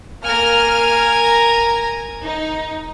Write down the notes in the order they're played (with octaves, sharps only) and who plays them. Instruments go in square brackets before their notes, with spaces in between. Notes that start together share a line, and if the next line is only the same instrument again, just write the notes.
[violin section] A#3 F6 [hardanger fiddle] A#4 G#5
[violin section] A#5
D#4